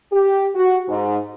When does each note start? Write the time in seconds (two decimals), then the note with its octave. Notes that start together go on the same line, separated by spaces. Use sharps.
0.12 G4
0.56 F#4
0.89 G#2